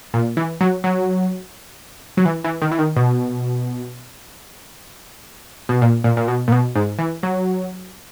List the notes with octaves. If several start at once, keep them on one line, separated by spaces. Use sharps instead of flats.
A#2
E3
F#3
F#3
F#3
E3
E3
D#3
E3
D#3
B2
B2
A#2
A#2
A#2
B2
A#2
B2
G#2
E3
F#3